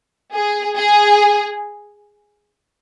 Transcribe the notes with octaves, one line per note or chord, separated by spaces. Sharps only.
G#4
G#4